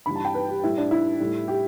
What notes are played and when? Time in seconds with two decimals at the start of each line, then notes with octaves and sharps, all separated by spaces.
0.06 G2 E3 G3 B5
0.16 A5
0.25 G5
0.35 B4
0.49 G4
0.63 A2 G3 E4
0.78 D4
0.91 E4
1.20 A2 G3
1.48 G4